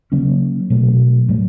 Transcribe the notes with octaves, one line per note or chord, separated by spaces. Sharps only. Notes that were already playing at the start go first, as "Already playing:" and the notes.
C#3 F#3 A#3 C#4
B2 F#3 A3
A2 F#3 A3